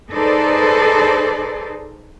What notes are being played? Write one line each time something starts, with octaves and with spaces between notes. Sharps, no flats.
D#4 G#4 A4 B4 C5 D5